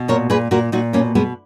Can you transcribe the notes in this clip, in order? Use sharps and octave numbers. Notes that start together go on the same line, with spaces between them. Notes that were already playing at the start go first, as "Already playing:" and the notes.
Already playing: B2
A#2 A#4 C#5
A#2 G#4 B4
A#2 F#4 A#4
A#2 D#4 F#4
B2 A#3 C#4
B2 G#3 B3